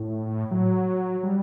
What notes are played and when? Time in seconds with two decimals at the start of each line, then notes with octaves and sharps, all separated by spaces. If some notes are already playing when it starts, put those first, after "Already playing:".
Already playing: A2
0.51 F#3
1.23 G3